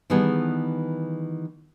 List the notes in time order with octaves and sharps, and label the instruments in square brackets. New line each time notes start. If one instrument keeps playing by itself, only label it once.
[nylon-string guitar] D#3 E3 G3 B3 G#4 A4